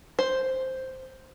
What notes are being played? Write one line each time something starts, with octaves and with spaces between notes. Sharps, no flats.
C5